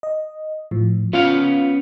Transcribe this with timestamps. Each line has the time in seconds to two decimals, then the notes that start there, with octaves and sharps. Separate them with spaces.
0.03 D#5
0.71 A2 F3
1.13 B3 C#4 F4 F5